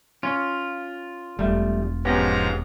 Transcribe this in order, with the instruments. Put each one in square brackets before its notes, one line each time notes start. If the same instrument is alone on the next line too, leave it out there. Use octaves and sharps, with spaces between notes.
[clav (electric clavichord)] C#4 C#5 [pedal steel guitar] F4
[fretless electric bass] E1 [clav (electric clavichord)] G3 A3
[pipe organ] G#2 F3 A#5 [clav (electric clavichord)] B3 C#4 G4